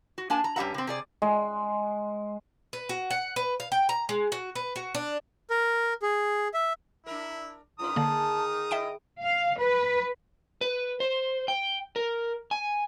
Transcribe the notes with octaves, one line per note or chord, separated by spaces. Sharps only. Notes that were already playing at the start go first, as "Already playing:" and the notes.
F#4
A#3 D4 G#5 A5
A#5
G2 C#4 G4 E5 F#5 A#5
C3 C4
C3 G#4 D5
G#3
B4
F#4
F#5
B4
F5
G5
A#5
G#3
F#4
B4
F#4
D4
A#4
G#4
E5
D4 E4 A#4
G#2 D#3 C#4 F4 B4 A#5 D#6
D3 A#3 G#4 A5
E4 D#5 E5 G5 D7
F5
B4
B4
C5
G5
A#4
G#5